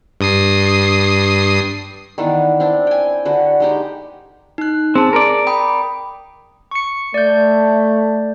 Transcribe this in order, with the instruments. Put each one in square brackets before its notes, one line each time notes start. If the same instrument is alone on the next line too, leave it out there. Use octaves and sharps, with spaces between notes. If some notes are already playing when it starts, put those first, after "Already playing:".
[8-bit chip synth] G2 D#6 C7
[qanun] D#3 E3 B3 D4
C4 D4 E4
G5 G#5
D3 F#4 B4
G#3 D#4 G4
[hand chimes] D#4 F#6
[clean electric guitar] C4 [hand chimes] G#4 A5
[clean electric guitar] A#4 D5
[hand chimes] G5 B5 D#6
[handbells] C#6 C#7
[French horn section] A3 [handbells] D5 G6